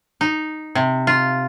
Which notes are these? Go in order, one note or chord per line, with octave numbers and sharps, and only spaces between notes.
D#4
C3
F4